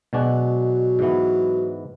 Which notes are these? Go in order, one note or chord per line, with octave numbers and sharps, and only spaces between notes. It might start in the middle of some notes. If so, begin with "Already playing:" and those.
B2 F#3 G#3 D4 F#4
G#2 E3 B3